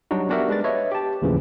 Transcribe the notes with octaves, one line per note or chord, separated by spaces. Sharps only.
F#3 G3 D4 D#4 F#4
B3 D4 F#4 G4 A#4 E5
G#3 D4 B4 A6
B4 C#5 D#5 E5
G4 A5
D#2 A2 C#3 E3 F3